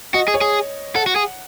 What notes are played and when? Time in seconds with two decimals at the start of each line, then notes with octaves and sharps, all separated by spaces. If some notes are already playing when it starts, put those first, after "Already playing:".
0.14 F#4 D#5
0.28 G#4
0.34 C#5
0.41 G#4
0.95 A4 F#5
1.07 F#4
1.16 G#4